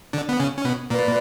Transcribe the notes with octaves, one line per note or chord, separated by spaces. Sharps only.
D3 D4
B3
C#3 C#4
C#4
B2 B3
A#2 A#3 B4 D5